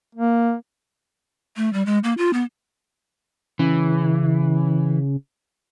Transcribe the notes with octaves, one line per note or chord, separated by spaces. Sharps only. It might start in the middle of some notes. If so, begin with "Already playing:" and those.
A#3
A3
G3
G#3
A#3
F4
B3
C#3 E3